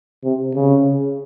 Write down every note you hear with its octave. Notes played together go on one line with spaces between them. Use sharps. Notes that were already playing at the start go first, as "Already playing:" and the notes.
C3
C#3